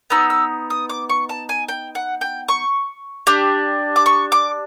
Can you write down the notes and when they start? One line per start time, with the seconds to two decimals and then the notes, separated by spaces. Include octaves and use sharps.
0.10 B3 D#4 E6
0.30 E6
0.70 D#6
0.90 D6
1.09 C#6
1.29 A5
1.49 G#5
1.69 G5
1.95 F#5
2.21 G5
2.48 C#6
3.27 D4 G4
3.96 D6
4.06 C#6
4.32 D6